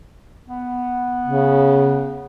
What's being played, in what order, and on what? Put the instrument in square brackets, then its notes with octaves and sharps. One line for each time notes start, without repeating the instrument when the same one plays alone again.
[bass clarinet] B3
[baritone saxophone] C#3